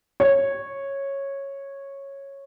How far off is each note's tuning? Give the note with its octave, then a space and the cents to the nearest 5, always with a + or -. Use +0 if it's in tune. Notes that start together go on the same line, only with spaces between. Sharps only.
C#5 -10